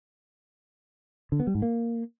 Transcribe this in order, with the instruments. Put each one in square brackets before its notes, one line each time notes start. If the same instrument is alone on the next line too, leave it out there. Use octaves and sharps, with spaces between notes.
[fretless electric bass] D3
B3
G3
G#2
A#3